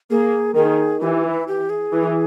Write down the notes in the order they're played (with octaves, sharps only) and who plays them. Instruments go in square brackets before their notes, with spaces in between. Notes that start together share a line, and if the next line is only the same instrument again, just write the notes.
[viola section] A#3 [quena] G#4
[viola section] D#3 [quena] G#4
[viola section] E3 [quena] G4
[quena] E4
G4
G#4
[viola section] E3